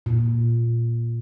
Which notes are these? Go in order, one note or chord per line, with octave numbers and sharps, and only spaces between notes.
A#2